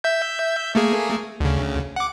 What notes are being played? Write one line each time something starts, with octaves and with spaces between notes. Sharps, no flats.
E5 G6
A3 A#3 G#4
D2 C#3
F#5 D6